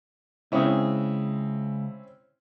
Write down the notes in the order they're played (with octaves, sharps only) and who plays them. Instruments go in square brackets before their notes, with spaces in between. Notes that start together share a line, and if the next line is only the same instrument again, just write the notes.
[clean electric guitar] C#2 G#4 [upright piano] C4 C#4 E4